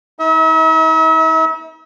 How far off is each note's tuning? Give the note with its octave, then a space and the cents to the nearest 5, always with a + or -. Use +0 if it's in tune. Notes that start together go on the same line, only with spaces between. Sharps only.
D#4 +45 E5 -40